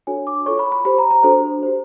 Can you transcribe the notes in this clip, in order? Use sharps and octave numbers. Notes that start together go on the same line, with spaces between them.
D4 F#4 A4 C#5 G#5
D6
F4 A4 C#5 C#6
B5
B5
G4 C5 B5
A#5
A#5
D4 F#4 A4 C5
G4 C5